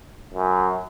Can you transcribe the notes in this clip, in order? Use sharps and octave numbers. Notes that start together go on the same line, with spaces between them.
F#2